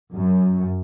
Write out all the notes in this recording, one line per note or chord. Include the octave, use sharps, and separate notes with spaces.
F#2